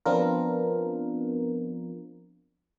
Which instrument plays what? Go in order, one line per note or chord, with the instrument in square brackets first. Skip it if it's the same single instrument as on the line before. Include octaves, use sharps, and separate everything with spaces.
[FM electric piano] F3 B3 C4 D4 F4 A#4